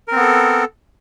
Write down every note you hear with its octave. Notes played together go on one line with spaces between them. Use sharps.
B3 C4 A4 A#4